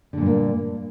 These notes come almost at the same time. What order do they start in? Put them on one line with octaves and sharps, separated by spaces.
D3 A#2 G2 A#3